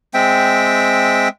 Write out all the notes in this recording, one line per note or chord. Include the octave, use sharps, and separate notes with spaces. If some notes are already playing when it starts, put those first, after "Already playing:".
G#3 C4 E5 G5